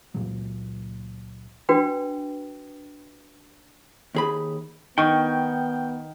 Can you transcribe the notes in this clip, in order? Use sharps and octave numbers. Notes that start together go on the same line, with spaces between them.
C#2 A#2 F#3
D4 F#4 B4 G5
D#2 G#4 B5
D#3 B3 G5 C#6